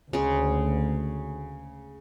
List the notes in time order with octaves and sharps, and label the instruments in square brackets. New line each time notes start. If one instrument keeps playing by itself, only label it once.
[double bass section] D2 [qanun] C#3 G#3